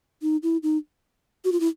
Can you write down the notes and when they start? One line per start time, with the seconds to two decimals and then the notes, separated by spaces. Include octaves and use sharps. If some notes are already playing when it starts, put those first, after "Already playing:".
0.22 D#4
0.43 E4
0.63 D#4
1.44 F#4
1.52 F4
1.60 E4